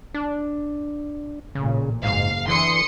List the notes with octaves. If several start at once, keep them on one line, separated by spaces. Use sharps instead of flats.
D4
A1 A#2 C#3
F#1 G#2 F5
D3 E3 C6 D#6 C#7